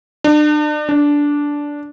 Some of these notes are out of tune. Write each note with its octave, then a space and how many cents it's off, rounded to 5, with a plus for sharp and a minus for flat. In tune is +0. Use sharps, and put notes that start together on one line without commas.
D4 +40
D4 -10